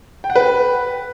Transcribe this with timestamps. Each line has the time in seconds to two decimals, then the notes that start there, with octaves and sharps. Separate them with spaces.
0.24 G5
0.30 F#5
0.36 B4